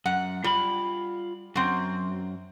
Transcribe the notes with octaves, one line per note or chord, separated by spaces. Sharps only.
F#2 F#5
G3 F4 B5
F#2 F#3 C4